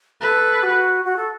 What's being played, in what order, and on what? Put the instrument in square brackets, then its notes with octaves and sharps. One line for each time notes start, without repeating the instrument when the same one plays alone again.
[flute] A4 [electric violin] B4
[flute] F#4
F#4
A4